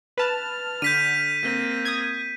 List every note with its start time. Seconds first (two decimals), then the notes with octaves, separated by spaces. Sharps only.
0.18 B4 A5 F6
0.82 D3 G6 B6 D#7
1.40 A#3 C4
1.85 D#6 G#6